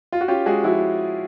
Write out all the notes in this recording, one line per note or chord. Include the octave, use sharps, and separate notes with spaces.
F4
F#4
C#4 F4 G4
G#3 F#4 G#4
F3 E4 F#4